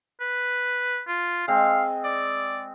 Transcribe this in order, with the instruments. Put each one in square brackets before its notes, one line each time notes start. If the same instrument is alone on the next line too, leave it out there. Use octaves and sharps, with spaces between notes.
[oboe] B4
F4
[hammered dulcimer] G#3 C4 [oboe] F5
[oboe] D5